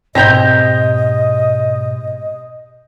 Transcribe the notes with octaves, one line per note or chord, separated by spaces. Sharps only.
G#2 B2 C4 G4 D#5 A#5 G6 A#6